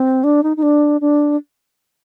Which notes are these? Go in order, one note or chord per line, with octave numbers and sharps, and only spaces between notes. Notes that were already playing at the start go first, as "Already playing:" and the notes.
Already playing: C4
D4
D#4
D#4
D4
D4